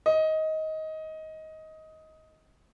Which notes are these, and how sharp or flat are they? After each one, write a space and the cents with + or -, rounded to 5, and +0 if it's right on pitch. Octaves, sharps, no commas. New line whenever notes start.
D#5 +15